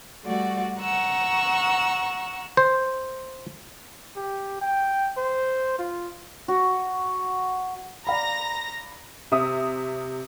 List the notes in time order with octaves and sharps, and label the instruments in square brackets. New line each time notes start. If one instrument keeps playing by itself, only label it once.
[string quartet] G3 A3 F#4 D5
F#5 A#5 C#6 E6
[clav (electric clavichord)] C5
[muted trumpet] G4
G5
C5
F4
[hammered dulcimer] F#4
[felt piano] D5 F5 B5 [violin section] A#5 A#6
[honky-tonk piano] C3 E5 D#6